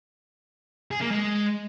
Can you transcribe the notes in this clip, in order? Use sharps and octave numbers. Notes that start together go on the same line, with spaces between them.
G#4
A#3
G#3